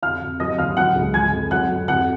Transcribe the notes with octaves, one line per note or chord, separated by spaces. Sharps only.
F2 F5 F6
F2
F#3 D#5 D#6
D#2 F5 F6
F#3 F#5 F#6
C#2
F3 G#5 G#6
F2
F#3 F#5 F#6
F2
F2 F#5 F#6